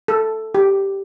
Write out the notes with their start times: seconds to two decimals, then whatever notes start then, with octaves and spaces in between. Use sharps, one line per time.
0.08 A4
0.55 G4